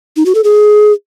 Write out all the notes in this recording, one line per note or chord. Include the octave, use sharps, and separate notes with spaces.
D#4
F#4
A4
G#4